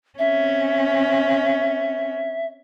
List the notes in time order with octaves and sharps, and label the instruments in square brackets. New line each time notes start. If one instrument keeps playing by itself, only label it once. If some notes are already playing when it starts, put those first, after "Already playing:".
[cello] C4 C#4 [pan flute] E5